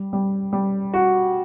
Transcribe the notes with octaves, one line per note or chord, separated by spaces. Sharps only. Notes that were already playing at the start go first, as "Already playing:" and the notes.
Already playing: G3
G3
G3
F#4